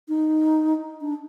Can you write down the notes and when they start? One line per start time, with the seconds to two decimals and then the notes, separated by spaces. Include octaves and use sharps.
0.08 D#4
1.01 D4